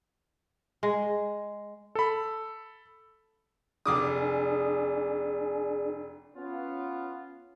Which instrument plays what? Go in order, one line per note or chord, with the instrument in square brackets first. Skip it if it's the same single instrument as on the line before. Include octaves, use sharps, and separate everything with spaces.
[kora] G#3
[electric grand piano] A4 B5
[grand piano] F1 D6 D#6 [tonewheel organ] D4 G#4
[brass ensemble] B3 C#4 F4